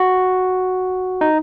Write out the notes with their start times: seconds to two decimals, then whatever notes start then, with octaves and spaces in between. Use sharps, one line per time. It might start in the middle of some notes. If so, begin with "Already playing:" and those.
Already playing: F#4
1.21 D#4